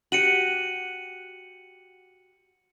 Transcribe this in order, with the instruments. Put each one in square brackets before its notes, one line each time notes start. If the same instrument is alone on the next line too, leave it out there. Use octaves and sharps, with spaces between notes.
[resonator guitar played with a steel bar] F#4 G4 [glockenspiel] C#7 D#7 F#7